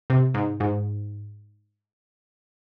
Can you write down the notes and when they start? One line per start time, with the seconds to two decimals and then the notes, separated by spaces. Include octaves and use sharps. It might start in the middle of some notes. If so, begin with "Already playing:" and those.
0.10 C3
0.34 G#2
0.60 G#2